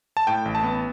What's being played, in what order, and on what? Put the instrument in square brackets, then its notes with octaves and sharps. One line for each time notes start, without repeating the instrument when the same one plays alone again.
[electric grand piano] A5
A2 G5
A1
A5
B3